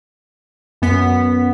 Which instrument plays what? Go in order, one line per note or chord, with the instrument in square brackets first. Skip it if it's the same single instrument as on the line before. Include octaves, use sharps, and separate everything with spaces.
[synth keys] F#2 B3 B6